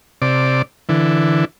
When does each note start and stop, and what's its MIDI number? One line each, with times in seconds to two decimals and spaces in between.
0.22 0.62 48
0.22 0.62 74
0.89 1.45 50
0.89 1.45 52